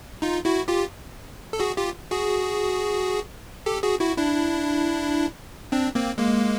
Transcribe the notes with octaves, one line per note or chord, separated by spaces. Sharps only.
D#4 F4
E4 F#4
F4 G4
A4
F#4 G#4
F4 G4
F#4 G#4
G4 A4
F#4 G#4
E4 F#4
D4 E4
C4 D4
A#3 C4
G#3 A#3